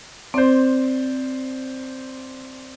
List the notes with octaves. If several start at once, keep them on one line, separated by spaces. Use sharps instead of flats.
C4 C5 D5